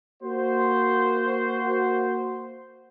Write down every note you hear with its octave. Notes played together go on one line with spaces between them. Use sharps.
A#3 F#4 C5